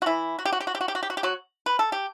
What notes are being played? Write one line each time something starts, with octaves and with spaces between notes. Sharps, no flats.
F#4
E3 E4
F#4
G4
F#4
G4
F#4
G4
F#4
G4
F#4
G4
F#4
G4
F#3 F#4
B4
A4
G4